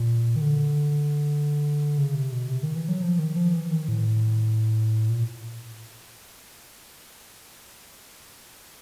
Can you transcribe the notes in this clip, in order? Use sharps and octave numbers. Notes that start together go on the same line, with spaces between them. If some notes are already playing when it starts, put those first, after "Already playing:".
Already playing: A#2
D#3
D3
C#3
C3
B2
C3
D#3
E3
F#3
F3
D#3
F3
E3
D#3
A2
A#2